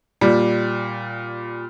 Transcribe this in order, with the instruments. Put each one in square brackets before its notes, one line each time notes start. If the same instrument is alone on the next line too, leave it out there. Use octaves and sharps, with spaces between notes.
[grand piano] A#2 G3